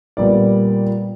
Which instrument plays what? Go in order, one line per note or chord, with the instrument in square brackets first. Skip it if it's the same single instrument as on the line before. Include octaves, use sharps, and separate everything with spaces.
[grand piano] A#2 G3 B3 D5